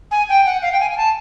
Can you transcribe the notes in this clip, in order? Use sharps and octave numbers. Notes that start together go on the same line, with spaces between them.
G#5
G5
F#5
F5
G5
G#5
G#5
A5